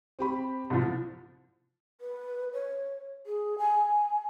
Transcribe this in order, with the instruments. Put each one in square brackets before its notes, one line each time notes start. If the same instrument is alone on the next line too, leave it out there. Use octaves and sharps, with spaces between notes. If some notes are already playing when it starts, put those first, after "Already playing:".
[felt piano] C4 G4 B5
[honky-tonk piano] C2 A2 F3
[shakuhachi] B4
C#5
G#4
G#5